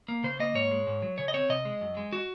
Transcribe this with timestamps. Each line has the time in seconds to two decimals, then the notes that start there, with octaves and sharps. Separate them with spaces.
0.08 A#3
0.24 C#3 C5
0.39 A#3 D#5
0.55 G#2 C#5
0.71 G#3
0.87 G#2
1.02 F#3
1.18 C#3 C#5
1.28 D#5
1.34 C4 C#5
1.49 C3 D#5
1.65 G#3
1.81 F#2
1.97 G#3
2.13 F#4